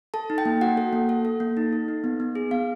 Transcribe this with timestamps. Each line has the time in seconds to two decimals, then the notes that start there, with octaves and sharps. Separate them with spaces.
0.14 A4 A5
0.30 D#4
0.38 G5
0.45 A#3
0.61 F#4 F#5
0.77 A4
0.93 A#3
1.09 A4
1.25 A4
1.40 A#3
1.57 D#4
1.73 A4
1.88 D#4
2.04 B3
2.20 B3
2.35 G#4
2.51 B3 F5